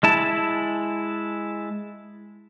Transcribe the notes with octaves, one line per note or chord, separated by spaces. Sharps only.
G#3 E4 A5